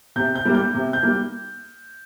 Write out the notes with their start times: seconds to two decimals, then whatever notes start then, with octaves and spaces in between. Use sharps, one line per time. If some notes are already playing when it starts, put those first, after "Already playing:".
0.16 C3 G6
0.35 G6
0.45 G3 A#3
0.55 G6
0.74 C3
0.93 G6
1.03 G3 A#3